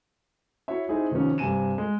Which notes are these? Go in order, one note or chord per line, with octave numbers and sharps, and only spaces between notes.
E4 F#4 C#5 E5
C4 D#4 E4 G#4
C3 D#3 F3 B3 C#4
G2 C3 G#5 D#7 E7
G#3